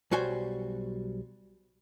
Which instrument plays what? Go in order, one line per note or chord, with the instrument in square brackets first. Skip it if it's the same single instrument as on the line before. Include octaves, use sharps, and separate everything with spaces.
[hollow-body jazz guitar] B1 G3 F#4 C5 G#5